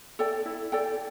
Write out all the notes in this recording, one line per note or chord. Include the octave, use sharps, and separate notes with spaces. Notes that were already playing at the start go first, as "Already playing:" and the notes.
A4 D5 G5
E4
A4 D5 G5